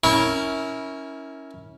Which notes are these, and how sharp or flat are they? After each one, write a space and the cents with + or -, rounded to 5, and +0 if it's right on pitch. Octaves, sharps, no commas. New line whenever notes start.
C#4 +0 E4 -25 A#4 +0